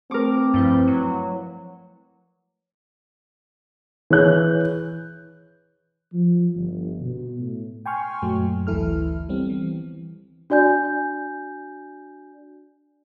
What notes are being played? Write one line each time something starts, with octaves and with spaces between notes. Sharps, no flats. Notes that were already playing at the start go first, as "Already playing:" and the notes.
A3 C4 A#4 D6
G2 F3 E4 B4
F#3
E3 G#4 C#5 F#6 G6
F3
G1
B2
A2
G5 G#5 C6 C#6 F6
F#2 A#2 F#3 A3
G#1 D2 E3 E4 A4 F6
G3 B3 C4
E3
D4 F#4 D5 G#5 G6